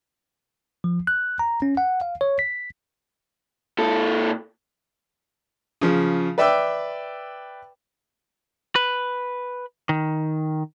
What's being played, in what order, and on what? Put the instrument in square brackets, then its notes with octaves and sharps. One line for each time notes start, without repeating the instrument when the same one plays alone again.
[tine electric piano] F3
F#6
A#5
C#4
F#5
F5
C#5
B6
[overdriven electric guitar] A#2 A4
[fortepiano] C#3 F3
B4 D5 E5 G5 D6 E6
[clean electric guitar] B4
D#3